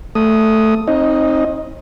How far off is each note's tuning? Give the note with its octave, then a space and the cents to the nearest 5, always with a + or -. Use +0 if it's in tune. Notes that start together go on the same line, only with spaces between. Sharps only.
A3 +0 D#6 +0
C4 +40 D#4 +15 D#5 +0